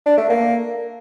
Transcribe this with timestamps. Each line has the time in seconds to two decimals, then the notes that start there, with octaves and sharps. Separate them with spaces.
0.06 D4
0.18 A3
0.29 A#3